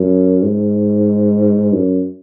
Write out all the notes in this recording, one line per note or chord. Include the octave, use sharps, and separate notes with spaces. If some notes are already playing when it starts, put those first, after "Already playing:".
Already playing: F#2
G#2
F#2